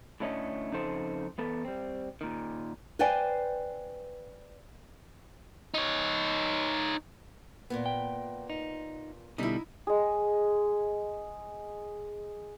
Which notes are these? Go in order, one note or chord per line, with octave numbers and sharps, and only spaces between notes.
A2 D3 A3 C#4 A#4 D#5
F2 C#3 D#4 A4 C5
E2 B3 A4
G3 C4
A#2 D#3
B4 C5 D5 F5 G5 G#5
D#4 C#5
A#2 A#3 B3
G5
D#4
B2 D3 G3 D#4 E4
G#3 G#4